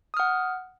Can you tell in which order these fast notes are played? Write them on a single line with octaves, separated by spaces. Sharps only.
D#6 F6 F#5